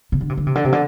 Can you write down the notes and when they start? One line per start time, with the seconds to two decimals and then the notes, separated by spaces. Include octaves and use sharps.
0.12 C3
0.21 D3
0.29 C3
0.37 D3
0.47 C3
0.55 D3
0.65 C3
0.73 D3